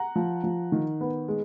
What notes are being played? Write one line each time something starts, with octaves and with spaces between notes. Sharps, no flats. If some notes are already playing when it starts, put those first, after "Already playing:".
Already playing: F#5 A#5
F3
F3
D#3
B3
G#3